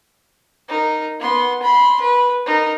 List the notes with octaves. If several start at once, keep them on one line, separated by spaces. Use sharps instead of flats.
D#4 A#4
B3 C6
B5 C6
B4
D#4 A#4